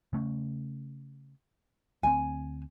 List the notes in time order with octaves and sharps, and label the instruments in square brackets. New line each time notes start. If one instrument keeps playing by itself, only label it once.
[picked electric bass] C#3 A3 C#4
[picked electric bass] D2 C4 [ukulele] G#5